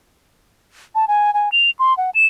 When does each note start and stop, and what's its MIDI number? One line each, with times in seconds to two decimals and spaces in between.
0.95 1.05 81
1.08 1.33 80
1.34 1.49 80
1.52 1.70 101
1.79 1.96 84
1.97 2.10 78
2.15 2.26 100